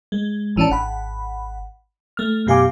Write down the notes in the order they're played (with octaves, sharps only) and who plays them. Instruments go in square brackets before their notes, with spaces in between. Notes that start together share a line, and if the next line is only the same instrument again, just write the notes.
[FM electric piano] G#3
A1 E3 C#4 D4 A5
G#1 F#5 B5
A3 F6
F#2 B2 G4 F5 G#5 D6